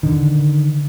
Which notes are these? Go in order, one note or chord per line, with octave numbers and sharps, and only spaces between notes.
D3 D#3